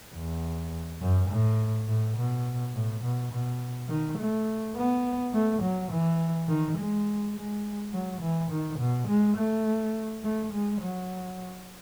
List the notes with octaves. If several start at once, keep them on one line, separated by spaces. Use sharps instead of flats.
E2
F#2
A2
A2
B2
A2
B2
B2
D#3
A3
B3
A3
F#3
E3
D#3
G#3
G#3
F#3
E3
D#3
B2
G#3
A3
A3
G#3
F#3